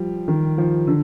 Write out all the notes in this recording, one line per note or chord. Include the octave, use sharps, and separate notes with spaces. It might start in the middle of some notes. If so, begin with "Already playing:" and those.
Already playing: F3 G3
D#3
F3
D3